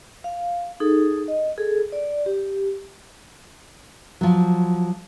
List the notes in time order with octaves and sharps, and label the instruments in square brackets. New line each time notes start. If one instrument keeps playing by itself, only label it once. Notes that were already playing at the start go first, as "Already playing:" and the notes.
[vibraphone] F5
D#4 G#4 A4
D#5
G#4 A4
D5
G4
[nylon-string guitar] F3 F#3